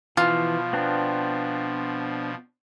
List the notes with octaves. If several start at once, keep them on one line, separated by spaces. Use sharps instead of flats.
B2 E3 F3 F4
B3 C4 D4